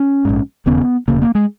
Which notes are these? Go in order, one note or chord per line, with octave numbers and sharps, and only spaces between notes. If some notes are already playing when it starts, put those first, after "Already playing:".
Already playing: C#4
A#1 G#2
E1 D#2 C#3 B3
E1 D#2 C#3 A#3
A#3
G#3